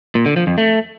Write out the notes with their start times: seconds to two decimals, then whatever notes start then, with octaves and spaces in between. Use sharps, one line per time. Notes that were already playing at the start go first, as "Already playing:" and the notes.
0.15 A#2
0.26 D3
0.36 F3
0.47 F2
0.58 A3